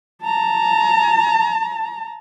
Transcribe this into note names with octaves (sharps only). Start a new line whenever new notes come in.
A5 A#5